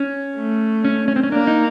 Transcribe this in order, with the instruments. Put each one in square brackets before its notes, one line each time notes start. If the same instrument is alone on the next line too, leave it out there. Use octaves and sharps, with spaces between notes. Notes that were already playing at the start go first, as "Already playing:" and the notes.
Already playing: [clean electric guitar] C#4
[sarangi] A3
[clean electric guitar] C#4
C#4
C4
C#4
[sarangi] A#3 [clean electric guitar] D4
[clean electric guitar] D#4